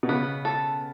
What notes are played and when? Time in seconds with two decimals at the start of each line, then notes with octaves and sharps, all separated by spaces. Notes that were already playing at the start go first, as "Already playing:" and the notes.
0.03 B2
0.09 C#3 B3
0.45 A4